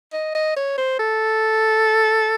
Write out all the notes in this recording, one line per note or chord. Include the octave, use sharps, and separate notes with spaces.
D#5
D#5
C#5
C5
A4